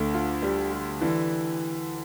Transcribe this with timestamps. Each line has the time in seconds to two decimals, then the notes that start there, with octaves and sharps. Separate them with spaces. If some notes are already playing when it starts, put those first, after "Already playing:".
Already playing: D2 D3 A3
0.14 F4
0.42 G3
0.72 G3
1.01 D3 E3